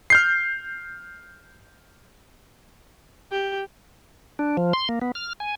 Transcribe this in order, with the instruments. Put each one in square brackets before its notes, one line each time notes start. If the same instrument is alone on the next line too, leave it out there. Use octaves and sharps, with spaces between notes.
[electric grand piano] F6 G6 C7
[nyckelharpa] G4
[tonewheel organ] D4
F3
C6
A#3
B3
F6
G#5